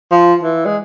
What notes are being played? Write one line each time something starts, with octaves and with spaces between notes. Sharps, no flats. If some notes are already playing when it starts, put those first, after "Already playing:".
F3
E3
G#3